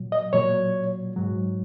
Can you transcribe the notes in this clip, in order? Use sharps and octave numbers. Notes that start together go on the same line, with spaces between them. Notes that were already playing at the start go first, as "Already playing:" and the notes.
Already playing: A#2 F#3
D#5
A#2 F#3 C#5
G#2 F#3